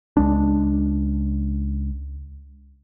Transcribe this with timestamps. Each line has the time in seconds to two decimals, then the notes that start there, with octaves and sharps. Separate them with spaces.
0.17 C#2 G#3 D4